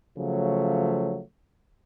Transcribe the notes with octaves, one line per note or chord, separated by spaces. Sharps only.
C#3 F3 F#3 A3